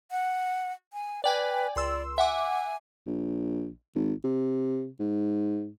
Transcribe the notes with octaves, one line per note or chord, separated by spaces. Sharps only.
F#5
G#5
B4 D5 G5 G#5
C#2 D5 C6 E6
E5 F#5 G#5 D6
A#1
G#1
C3
G#2